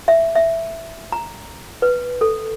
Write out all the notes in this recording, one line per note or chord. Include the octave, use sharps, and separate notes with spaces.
E5
E5
A#5
B4
A4